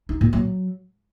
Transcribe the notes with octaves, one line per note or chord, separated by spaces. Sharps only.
D#4
A#2
F#3